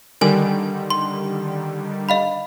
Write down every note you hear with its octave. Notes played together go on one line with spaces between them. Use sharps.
D3 D#3 G3 A#4 G#5
C6
D#5 F5 B5